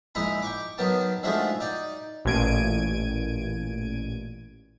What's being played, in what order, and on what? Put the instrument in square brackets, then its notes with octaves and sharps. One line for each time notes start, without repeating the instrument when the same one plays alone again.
[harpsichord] A#1 G#3 D#4 E4 A#5 B5
G5 C#6 D6
D#3 F#3 B3 G5 A5
D3 D#3 F3 G#3 A3 F#4
D#4 D5 G5
[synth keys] A1 A#2 G#6 D7 D#7